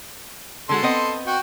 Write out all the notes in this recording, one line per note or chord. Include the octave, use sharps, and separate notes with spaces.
D3 G#3 F#4 A4 C6
B3 C4 D#5
F#4 G5